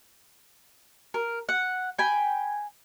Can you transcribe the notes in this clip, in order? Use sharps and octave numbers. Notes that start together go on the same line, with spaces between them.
A#4
F#5
G5 G#5 B5